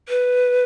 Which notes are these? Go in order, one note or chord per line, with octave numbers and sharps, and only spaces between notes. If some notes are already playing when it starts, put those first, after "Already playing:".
B4